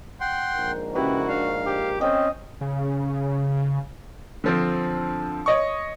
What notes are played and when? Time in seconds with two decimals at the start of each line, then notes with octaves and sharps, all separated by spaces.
0.20 F#5 G5 C6
0.56 A#1 G#2 A#4
0.95 C#3 E4 F#4 G4 B4
1.29 D4 F5
1.66 G4
2.01 C4 C#4 D#5 G5
2.61 C#3
4.44 D3 F3 C4
5.46 C#5 D#5 C#6